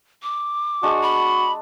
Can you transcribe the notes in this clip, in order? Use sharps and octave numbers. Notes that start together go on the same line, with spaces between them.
D6
G#3 D4 F#4
B5